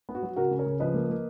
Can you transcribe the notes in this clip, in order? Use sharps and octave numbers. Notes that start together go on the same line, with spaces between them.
B3
F#4
F#3
C#3 F#4 A#4
C#3
A#4 C#5
C#3
F3 B4 D#5
A#3
A#3